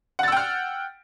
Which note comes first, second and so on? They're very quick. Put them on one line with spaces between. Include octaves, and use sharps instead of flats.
F#5 A6 E6 G5 F6